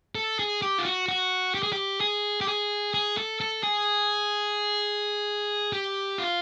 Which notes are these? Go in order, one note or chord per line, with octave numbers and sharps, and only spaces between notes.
A4
G#4
G4
F4
F#4
F#4
G4
G#4
G4
G#4
G4
G#4
G#4
A4
A4
G#4
G4
F4